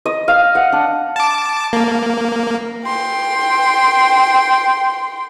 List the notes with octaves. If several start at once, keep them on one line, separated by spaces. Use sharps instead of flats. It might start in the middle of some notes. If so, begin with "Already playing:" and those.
D#5
F5
F#5
D4
A5 D6
A#3
G5 C6